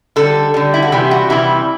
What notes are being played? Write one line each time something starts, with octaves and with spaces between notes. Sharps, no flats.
D3 G3 A4
D3 G3
E4
F#4
C3 E3 G3 G4
F#4
C3 E3 G3 E4